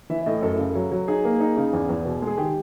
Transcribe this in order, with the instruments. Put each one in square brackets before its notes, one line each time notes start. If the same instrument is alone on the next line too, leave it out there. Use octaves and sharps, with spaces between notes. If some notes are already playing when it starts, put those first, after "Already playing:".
[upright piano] E3 E5
E5
A2 D#5
F#2 A4
C#3
F#3
F#3
D#4 G#4
A#3
D#4
C#3
E2
E2
B2
G#3
G#4
D#3 G4